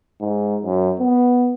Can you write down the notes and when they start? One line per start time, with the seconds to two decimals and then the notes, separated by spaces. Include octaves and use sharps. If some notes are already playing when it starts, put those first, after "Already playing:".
0.20 G#2
0.64 F#2
1.00 B3